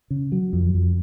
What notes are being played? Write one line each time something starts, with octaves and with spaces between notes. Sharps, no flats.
C#3
F#3
F2
F2